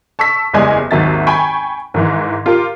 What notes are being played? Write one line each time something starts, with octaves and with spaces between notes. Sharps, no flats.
A5 C#6 E6 B6
F#1 E2 G3 G#3 D#5 G#5
G#1 D#2 D#3 F#3 E5 A6
G5 G#5 B5 C#6
G#2 D#3 E3
F4 G4 A#4